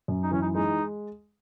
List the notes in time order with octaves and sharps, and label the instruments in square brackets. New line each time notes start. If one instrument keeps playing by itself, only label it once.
[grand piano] F#2
[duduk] D#4
[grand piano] E3 [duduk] C#4
[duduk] D#4
[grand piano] G#3 [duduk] D#4